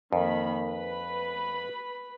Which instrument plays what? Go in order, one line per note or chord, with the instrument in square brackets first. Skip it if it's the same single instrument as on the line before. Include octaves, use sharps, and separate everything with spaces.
[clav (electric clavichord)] F2 [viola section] D#3 A#3 B5
[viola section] B4 B5